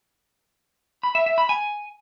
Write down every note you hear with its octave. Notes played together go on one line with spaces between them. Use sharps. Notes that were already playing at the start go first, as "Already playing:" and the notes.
B5
E5
E5
B5
G#5